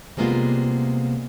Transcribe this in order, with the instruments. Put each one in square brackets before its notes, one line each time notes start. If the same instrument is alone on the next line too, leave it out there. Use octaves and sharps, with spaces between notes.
[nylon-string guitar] C3 G3 G#3 A#3 B3 F4